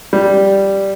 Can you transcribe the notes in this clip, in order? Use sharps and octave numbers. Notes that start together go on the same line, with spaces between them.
G3